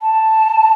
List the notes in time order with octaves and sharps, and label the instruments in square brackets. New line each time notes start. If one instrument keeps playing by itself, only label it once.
[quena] A5